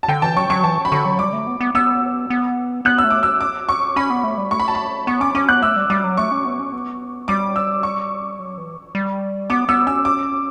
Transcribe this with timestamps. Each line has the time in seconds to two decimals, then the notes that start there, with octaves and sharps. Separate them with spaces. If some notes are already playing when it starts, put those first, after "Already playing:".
0.03 A5
0.08 D3 G5
0.22 E3 A5
0.36 F#3 C#6
0.50 F#3 C#6
0.64 E3 A5
0.85 B5
0.92 D3 C#6
1.06 F#3
1.19 G3 D6
1.33 A3
1.47 B3
1.61 B3
1.75 B3 E6
2.30 B3
2.85 B3 F#6
2.98 E6
3.04 A3
3.11 D6
3.23 E6
3.41 D6
3.69 C#6
3.96 C#4 B5
4.10 B3
4.24 A3
4.38 G3
4.51 A3 C#6
4.60 B5
4.68 A5
4.75 B5
5.07 B3 C#6
5.21 C#4 D6
5.35 C#4 D6
5.49 B3 F#6
5.62 A3 E6
5.76 G3
5.90 G3 D6
6.04 F#3
6.17 A3 C#6
6.32 C#4
6.45 B3
6.59 C#4
6.73 B3
7.28 G3 D6
7.56 E6
7.83 C#6
8.40 F#3
8.58 E3
8.95 G3
9.50 B3 D6
9.69 B3 E6
9.87 C#4 E6
10.05 D6